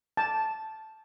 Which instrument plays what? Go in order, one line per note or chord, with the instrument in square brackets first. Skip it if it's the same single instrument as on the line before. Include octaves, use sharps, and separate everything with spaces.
[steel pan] A5